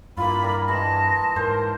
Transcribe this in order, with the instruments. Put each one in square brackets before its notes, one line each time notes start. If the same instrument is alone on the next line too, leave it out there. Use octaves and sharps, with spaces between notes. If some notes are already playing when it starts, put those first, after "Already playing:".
[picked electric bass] G2 [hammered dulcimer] A#3 E4 F4 [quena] B5
[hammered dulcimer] G3 A#4
[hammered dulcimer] E3 G#3 [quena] A5 [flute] A#6
[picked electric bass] G#2 [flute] A#4 [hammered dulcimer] C5